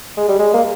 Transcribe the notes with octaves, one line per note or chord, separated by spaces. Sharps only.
G#3
G3
G#3
A#3